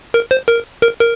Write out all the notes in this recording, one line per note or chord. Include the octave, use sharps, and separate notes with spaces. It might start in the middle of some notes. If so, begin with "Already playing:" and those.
A#4
C5
A#4
A#4
A#4